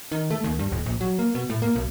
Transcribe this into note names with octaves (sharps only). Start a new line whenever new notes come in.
D#3
A3
D#2
G2
D#1
A#1
F#3
A#3
B2
A2
A#3
B1